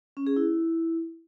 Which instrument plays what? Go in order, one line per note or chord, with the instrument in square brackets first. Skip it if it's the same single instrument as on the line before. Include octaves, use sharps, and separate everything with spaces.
[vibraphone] C#4
G#4
E4